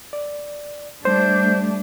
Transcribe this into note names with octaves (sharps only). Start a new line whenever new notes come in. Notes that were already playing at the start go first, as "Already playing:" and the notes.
D5
G3 A3 D4 C5 G6